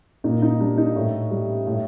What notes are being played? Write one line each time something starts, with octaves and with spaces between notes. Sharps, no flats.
A#2 D#4
D#4
G3 D4
D#4
A2
G3
A2